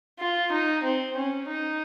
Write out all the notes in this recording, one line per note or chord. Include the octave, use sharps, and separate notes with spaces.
F4
D#4
C4
C#4
D#4